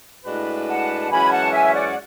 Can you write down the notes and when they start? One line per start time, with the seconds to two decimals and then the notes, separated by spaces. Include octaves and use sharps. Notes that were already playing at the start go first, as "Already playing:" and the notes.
0.25 A2 G#3 D4 F#4 B4
0.67 F#5 A5
1.10 F#2 E3 G#3 C#4 F#4 G#5 B5
1.25 G#5
1.31 F#5 A5
1.52 E5 G#5
1.73 D5 F#5
1.90 F#5